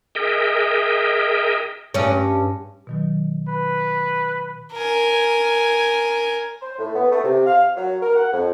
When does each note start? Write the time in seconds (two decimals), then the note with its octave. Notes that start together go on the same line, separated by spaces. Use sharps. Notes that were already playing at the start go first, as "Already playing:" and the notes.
0.15 G#4 A#4 D#5 E5 G5
1.94 G2 C#4
2.87 B2 D#3 F#3
3.48 B4
4.73 A#4 G#5
6.61 C5
6.78 A2
6.95 B3
7.11 A3
7.24 C3
7.46 F5
7.76 F#3
8.02 A#4
8.15 F#5
8.32 F2